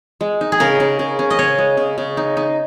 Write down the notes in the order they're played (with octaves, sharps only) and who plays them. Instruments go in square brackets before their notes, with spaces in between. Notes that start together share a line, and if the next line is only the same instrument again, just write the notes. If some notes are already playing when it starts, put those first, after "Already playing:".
[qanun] G#3
D#4
[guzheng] G#4
[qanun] C#3 [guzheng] A#4
[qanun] C#3
C#3
C#4
[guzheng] D#5
[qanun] C#3 [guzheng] C#5
[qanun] G#3
C#3
C#3
D#4
D#4